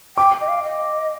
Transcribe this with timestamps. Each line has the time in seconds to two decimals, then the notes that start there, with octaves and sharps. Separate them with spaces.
0.17 G5 D6
0.41 D#5
0.48 F5
0.63 D#5